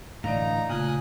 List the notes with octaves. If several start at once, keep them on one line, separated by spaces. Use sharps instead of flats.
A2 D3 E3 D#4 D5 F5 A#5
A#2 C#3 A3 F4 G#5 D#6 F#6